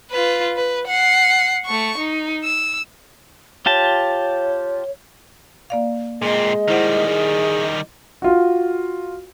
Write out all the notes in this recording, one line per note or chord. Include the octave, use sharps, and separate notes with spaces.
F4 B4
B4
F#5 C7
A3 C#6
D#4
E6
F4 G4 C#5 A5
A#3 D5 F5
A#2 G#3 C4 D#5
D#3 G3 E4 C5 F#5
G#4
F4 F#4